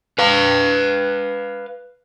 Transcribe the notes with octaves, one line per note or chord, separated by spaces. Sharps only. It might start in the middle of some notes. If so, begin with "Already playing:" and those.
B4 F5